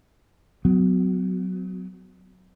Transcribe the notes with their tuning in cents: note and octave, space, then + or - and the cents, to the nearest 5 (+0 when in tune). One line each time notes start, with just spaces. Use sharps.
F#3 +0 B3 +40